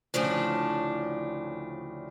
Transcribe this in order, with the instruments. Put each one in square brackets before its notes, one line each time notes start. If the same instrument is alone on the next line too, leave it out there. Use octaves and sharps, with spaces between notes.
[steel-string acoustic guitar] D2 A2 C#3 F3 D4